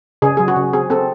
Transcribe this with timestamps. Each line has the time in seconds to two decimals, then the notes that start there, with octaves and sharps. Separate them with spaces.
0.22 C#3 G#4
0.37 F#3 G#4
0.48 F#4
0.56 C#3
0.73 C4 G#4
0.90 C4 A4